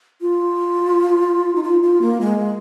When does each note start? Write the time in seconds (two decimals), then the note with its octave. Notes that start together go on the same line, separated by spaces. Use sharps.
0.21 F4
1.56 D#4
1.63 F4
1.83 F4
2.02 A#3
2.21 G#3